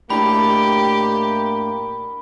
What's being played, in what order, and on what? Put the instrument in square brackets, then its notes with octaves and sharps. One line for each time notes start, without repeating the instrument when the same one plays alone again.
[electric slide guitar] A2 D4 [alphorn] A#3 [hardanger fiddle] G4 [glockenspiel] B5